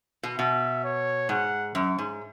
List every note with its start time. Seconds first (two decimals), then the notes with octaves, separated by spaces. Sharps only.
0.23 B2
0.38 B2 E5
0.84 C#5
1.29 G#2 F#5
1.75 F#2
1.98 G#2